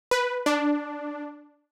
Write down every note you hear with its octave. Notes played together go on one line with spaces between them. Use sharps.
B4
D4